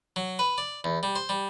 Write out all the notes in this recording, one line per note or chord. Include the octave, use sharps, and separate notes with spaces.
F#3
B4
D5
E2
G3
C5
G3